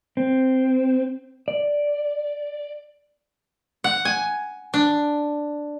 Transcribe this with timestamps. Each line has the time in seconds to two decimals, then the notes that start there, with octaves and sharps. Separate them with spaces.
0.17 C4
1.48 D5
3.84 F#5
4.05 G#5
4.74 D4